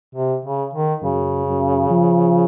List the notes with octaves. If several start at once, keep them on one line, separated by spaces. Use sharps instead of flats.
C3
C#3
D#3
F#2 C#3
F#2
F3